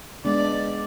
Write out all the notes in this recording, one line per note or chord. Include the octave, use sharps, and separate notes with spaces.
G#3 B3 D4 D5